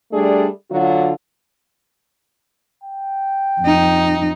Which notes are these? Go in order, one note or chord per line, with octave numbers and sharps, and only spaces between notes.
G3 A3 D4 G#4
D3 F#3 F4 F#4
G5
F2 D#4